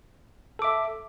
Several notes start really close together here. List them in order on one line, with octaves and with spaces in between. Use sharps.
A4 D6 E5